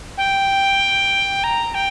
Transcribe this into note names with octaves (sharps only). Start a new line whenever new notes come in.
G5
A#5
G5